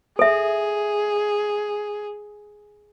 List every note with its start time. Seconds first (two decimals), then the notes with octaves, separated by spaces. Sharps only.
0.19 G#4 A4 E5